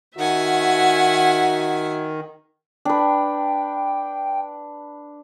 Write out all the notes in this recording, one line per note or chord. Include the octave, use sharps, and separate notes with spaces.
D#3 F#4 E5 F#5 G#5
D4 B4 G5